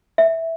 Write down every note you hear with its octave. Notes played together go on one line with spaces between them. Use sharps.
E5